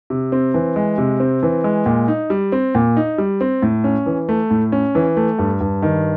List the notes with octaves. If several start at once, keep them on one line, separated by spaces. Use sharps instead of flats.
C3
C4
E3
G#3
C3
C4
E3
G#3
A#2
D#4
G3
C4
A#2
D#4
G3
C4
A2
C#4
E3
A3
A2
C#4
E3
A3
G2
G2
D#3